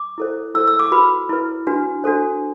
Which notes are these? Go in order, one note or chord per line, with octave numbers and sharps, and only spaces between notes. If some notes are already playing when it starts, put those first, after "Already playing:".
Already playing: D6
E4 A4 C5
E4 A4 C5 E6
E6
D6
F#4 B4 B5
E4 B4
D4 F#4 B4
D4 F#4 A4 C5